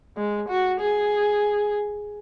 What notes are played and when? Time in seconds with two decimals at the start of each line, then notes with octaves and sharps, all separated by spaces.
0.17 G#3
0.48 F#4
0.81 G#4